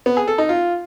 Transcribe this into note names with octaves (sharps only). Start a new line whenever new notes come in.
B3
G#4
A4
D#4
F4